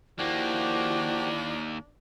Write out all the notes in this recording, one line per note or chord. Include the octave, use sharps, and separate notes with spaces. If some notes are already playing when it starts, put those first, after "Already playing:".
D#2 F3 A#3 D4 E4 F#4 G4